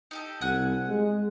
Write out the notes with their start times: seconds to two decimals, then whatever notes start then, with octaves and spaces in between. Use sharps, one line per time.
0.11 D#4 G4 A4
0.41 C2 F#5 G#5 F#6
0.89 G#3